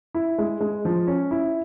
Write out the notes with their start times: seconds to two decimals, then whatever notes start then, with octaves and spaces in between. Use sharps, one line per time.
0.14 E4
0.38 G#3
0.61 G#3
0.85 F3
1.07 C#4
1.31 E4